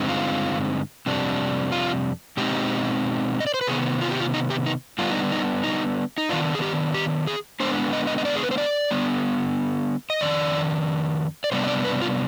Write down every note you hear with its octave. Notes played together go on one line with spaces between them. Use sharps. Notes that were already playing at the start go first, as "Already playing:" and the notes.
Already playing: G2 D3 G#3 C4 D#4
F4
F2 C3 G3 D4
F4
B2 G#3 C4 D#4 G4
D#5
D5
C5
B4
C3 D#3 B3 G#4
F4
G4
F4
D#4
G4
D#4
D3 G3 B3 D4 F4
D#4
D#4
D#4
D#4
D#3 B3 D4 F4
G#4
G4
G4
G#4
D3 G#3 B3 D4 C5
D#5
D#5
D#5
D5
G#4
B4
C5
D5
D3 G3 B3
D#5
F2 D#3 D4 D5
D5
C3 G3 B3 D4 C5
D#5
D5
B4
F4